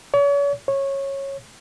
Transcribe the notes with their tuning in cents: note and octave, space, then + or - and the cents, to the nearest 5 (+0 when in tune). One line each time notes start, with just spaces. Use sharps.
C#5 +40
C#5 -15